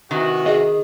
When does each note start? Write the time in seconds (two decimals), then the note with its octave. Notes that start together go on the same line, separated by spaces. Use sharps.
0.11 C3 D#3 E3 F#4
0.46 G#4 D#5